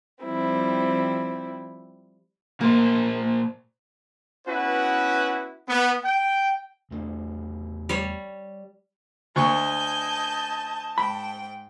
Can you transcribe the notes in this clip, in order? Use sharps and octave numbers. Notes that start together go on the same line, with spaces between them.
F3 G3 C4 E4
A#2 A#3 C5
B3 C#4 E4 F#4 B4
B3
G5
E2 A3 D4
G3 C#5
D2 D#5 G#5 A5 C#6 G6
G#2 G5 B5